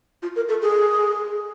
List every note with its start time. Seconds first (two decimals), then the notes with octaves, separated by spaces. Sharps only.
0.22 F4
0.36 A#4
0.49 A4
0.62 G#4